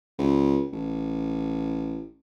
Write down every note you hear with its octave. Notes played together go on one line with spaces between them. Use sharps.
C#2
A1